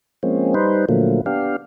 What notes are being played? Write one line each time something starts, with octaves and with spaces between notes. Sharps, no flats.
F3 G#3 A#3 C4 C#4
G3 D#4 B4 C5
A#2 D3 F3 F#3 A3 A#3
B3 D4 G4 F5